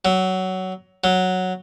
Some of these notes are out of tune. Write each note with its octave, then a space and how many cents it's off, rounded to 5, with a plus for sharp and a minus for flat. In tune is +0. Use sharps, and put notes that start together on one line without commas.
F#3 +15
F#3 -5